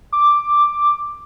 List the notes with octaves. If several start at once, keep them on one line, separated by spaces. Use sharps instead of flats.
D6